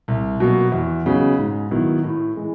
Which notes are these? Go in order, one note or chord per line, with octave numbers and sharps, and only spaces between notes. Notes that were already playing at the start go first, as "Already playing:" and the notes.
C2
B2 F#3 A#3
E2
C#3 F#3 B3 D#4
G#2
D#3 F#3 B3 E4
A2
E3 G#3